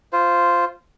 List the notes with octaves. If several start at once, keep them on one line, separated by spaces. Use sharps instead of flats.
F4 C5